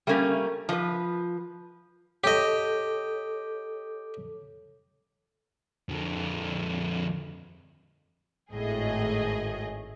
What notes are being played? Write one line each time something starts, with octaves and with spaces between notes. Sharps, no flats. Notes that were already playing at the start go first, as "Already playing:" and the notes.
G3 A3 A#3 C#4
F3 B4
G4 A4 C#5 D#5
F2 D3
G#1 A2 G#4 D#5